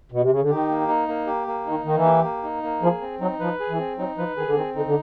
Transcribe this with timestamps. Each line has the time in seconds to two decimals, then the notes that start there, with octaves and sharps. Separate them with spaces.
0.12 B2
0.21 C3
0.31 C#3
0.41 D3
0.49 D#3 G4
0.70 A#3
0.88 D#4
1.08 A#3
1.27 G4
1.47 A#3
1.67 D#3 D#4
1.84 D#3 A#3
1.95 E3
2.05 G4
2.23 A#3
2.43 D#4
2.63 A#3
2.82 F3 G#4
3.01 C4
3.21 F#3 D#4
3.40 F3 B4
3.60 G#4
3.69 E3
3.78 C4
3.98 F#3 D#4
4.17 F3 B4
4.37 D#3 G#4
4.46 D3
4.56 D#3 C4
4.75 D3 D#4
4.86 D3